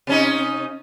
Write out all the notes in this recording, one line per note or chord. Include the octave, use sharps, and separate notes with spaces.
C3 C#4 D#4